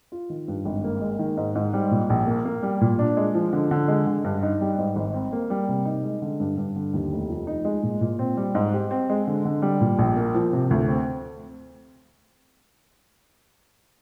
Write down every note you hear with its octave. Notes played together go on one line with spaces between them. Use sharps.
F4
D#3
G2
G#1
A#3
G#3
D#3
G#2
G#2
G3
A#2
A#1
A#3
A#3
G3
A#2
D4
G#3
F3
D3
D3
G#3
D3
G2
D#4
G3
G#2
G#1
C4
A#3
G3
C3
D#4
G#3
D3
G2
G2
D3
D#2
F1
F3
D#4
G#3
A#2
A#2
C4
G3
G#2
G4
C4
G#3
D3
D3
G3
A#2
A#1
A#3
F3
C3
D2
C4